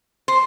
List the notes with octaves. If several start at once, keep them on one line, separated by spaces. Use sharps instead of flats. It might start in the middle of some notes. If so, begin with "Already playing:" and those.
C5